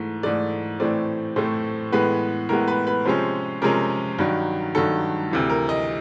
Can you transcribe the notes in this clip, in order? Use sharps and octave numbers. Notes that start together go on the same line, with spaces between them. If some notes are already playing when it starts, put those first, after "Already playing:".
Already playing: G#2 E3 A3
G#2 E3 A3 D5
A2 E3 A3 C4 D5
A2 E3 A3 C4 C5
A2 E3 G#3 B3 B4
A2 E3 G#3 B3 A#4
B4
B4
C3 F3 G#3 C#4 C5
C3 F3 G#3 C#4 A#4
G2 D#3 F#3
G2 D#3 F#3 A4
D2 C3 E3
A#4
D#5